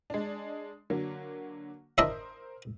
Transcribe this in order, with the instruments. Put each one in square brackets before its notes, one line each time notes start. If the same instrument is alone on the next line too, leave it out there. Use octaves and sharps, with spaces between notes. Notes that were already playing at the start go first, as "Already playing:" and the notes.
[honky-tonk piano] G#3 D4
D3 F#3 A#3
[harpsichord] D4 D#5 E5 [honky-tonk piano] A#4 C5